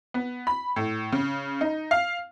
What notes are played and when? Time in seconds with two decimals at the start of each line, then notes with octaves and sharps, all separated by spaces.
0.14 B3
0.47 B5
0.76 A2
1.12 C#3
1.61 D#4
1.91 F5